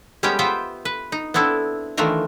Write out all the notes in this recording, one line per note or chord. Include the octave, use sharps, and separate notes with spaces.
G3 G#3 B3 C#4 G4 G5
B3 F4 B4 C5 E5 G5
B4
D#4
B3 C4 D4 E4 A4
D#3 E3 A3 D4 F4 A#4